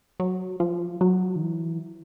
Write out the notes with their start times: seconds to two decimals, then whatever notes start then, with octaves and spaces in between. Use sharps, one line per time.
0.20 F#3
0.60 F3
1.01 F#3
1.36 D#3
1.42 E3